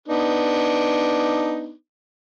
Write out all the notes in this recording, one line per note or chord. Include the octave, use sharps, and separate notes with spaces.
B3 D4 D#4